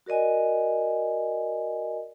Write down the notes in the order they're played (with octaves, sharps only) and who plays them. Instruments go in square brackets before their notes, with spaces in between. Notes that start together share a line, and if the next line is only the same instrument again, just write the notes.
[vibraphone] F#4 A#4 D5 D#5 G#5